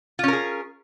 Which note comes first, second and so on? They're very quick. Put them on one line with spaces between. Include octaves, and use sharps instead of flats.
F4 C#4 A#4 G#4